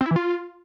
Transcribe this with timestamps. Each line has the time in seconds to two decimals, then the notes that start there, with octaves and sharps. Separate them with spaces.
0.01 C4
0.06 E4
0.11 E3
0.16 F4